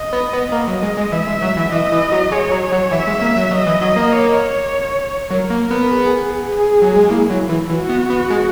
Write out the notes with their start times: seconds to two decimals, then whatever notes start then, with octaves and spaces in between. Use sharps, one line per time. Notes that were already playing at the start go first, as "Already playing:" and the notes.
Already playing: D#5
0.13 B3
0.33 B3
0.52 A#3 D#5
0.68 F#3
0.83 G#3
0.97 G#3
1.12 E3 E5
1.27 G#3
1.42 F#3
1.57 E3
1.72 E3 D#5
1.92 E3
2.12 F#3
2.32 G#3 C#5
2.51 F#3
2.72 F#3
2.91 E3 E5
3.07 G#3
3.21 A#3
3.36 F#3
3.51 F#3 D#5
3.66 E3
3.81 F#3
3.96 A#3
4.12 C#5
5.31 F#3 A#4
5.50 A#3
5.71 B3
5.91 G#4
6.50 G#4
6.82 F#3
6.96 G#3
7.10 A#3 E4
7.30 F#3
7.49 E3
7.70 E3 F#4
7.89 B3
8.10 B3
8.30 G#3